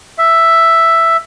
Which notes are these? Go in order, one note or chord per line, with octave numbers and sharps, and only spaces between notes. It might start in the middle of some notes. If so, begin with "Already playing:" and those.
E5